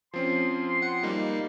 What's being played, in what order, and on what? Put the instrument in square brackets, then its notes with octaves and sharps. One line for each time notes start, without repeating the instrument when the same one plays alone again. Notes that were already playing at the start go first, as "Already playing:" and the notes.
[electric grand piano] F3 C4 C#4 [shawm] C6
[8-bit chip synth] F#5 C#7
G3 A#3 D#4